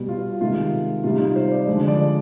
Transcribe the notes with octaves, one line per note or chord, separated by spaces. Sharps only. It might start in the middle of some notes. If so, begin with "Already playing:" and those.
Already playing: B2 G3
F4
C3 D#3 G#3 F4
C3 G3 F4
D#4
F4
C5
D5
D3 F3 G#3
D5